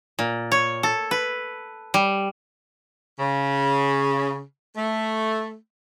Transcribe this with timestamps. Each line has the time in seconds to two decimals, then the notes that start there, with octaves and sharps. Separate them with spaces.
0.19 A#2
0.52 C#5
0.83 A4
1.11 B4
1.94 G3
3.19 C#3
4.77 A3